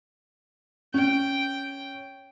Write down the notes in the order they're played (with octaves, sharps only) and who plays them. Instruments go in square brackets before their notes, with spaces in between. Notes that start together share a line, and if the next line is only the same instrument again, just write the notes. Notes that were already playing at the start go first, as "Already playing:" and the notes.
[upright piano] C#4 [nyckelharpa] G5